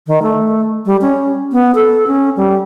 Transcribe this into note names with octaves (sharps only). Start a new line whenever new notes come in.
D#3
A3
G3
C#4
B3
A4
C#4
G3